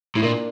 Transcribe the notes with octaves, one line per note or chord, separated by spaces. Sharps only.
A2 E4
A#2 A#3 D4